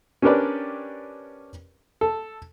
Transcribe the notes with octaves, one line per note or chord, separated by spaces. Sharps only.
C#4 D4 G4 A#4 B4 D5
A4